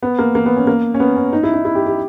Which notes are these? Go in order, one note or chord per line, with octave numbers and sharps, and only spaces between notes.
B3
A#3
A#3
B3
C#4
A#3
C#4
B3
C#4
D#4
E4
D#4
E4
G4
G4